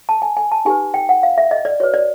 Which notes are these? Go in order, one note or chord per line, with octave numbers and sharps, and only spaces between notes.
A5
G#5
G#5
A5
D#4 G4 B4 G#5
G5
F#5
F5
E5
D#5
D5
F#4 B4 C#5
D5